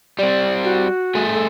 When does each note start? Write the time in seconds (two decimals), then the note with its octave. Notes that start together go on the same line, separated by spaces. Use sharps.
0.19 G3 C4 D5
0.64 F#4
1.15 A3 G#4
1.34 A4